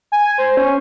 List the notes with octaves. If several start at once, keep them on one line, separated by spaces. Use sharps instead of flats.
G#5
C5
C#4